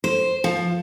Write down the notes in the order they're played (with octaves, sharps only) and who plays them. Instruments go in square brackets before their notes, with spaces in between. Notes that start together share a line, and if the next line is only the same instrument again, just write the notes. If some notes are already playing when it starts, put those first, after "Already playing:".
[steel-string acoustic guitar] C5
F3